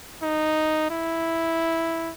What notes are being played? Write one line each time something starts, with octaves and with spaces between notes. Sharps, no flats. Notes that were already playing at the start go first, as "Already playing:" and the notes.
D#4
E4